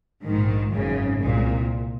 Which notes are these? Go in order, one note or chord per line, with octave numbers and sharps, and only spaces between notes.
A#1 G#2 D#3
G#1 F#2 C#3
C2 A#2 G#3